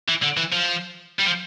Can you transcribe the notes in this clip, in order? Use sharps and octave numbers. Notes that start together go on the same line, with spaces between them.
E3
D3
E3
F3
G3
F3